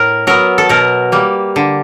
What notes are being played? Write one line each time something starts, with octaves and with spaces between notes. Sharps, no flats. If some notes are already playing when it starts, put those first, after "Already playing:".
Already playing: A2 A#4
F#3 B3 A#4
A4
B2 A#4
G3 A#3
D3